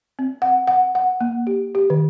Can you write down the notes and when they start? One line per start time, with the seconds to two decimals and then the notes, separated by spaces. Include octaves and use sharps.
0.19 C4
0.42 F#5
0.67 F#5
0.95 F#5
1.21 A#3
1.47 G4
1.75 G4
1.90 D#3